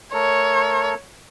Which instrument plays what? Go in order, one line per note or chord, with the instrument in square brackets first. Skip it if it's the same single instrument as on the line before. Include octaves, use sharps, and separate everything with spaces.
[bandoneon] A3 A4 A#4 [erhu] C#5